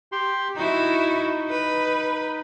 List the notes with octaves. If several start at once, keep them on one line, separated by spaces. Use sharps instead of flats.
G4 C6
D#4 E4 F#4
B4